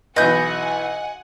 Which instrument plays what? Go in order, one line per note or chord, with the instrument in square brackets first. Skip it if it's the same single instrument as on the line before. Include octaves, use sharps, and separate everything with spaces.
[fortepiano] B1 E3 B4 [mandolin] D#5 G6 [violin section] F#5 G#5